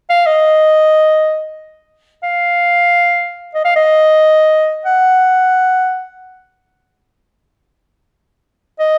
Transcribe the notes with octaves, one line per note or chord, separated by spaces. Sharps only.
F5
D#5
F5
D#5
F5
D#5
F#5
D#5